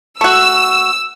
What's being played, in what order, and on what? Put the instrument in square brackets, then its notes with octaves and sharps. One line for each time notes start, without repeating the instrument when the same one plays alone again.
[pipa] A3 F#4 [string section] E6